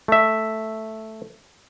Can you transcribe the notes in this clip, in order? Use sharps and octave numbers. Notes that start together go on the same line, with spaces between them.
A3 E5